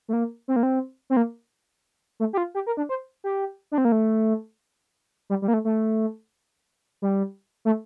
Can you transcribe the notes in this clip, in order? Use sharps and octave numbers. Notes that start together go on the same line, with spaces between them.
A3
A#3
C4
A#3
C4
C4
A#3
A3
G4
F4
G4
A#4
D4
C5
G4
D4
C4
A#3
A3
G3
G3
A#3
A3
A3
G3
A3